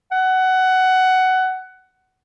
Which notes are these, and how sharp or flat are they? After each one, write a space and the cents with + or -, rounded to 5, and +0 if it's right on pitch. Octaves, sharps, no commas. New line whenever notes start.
F#5 +15